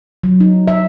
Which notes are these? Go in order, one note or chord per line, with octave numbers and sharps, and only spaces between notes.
F#3
D#4
E5